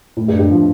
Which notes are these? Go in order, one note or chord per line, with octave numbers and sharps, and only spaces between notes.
A2
G2
G2
F3